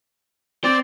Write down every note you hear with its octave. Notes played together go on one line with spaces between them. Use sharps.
C4 C5 D5